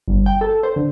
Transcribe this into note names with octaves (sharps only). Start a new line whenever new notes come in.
G1
G5
A4
C5
D3